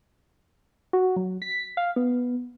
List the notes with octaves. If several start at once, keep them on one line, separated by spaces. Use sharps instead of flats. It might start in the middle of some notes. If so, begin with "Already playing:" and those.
F#4
F#3
B6
F5
B3